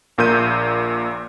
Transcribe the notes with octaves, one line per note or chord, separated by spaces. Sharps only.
A#1 A#2 A#4 G6 D#7